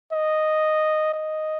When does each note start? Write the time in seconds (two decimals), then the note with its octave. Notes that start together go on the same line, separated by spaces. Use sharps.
0.12 D#5
1.14 D#5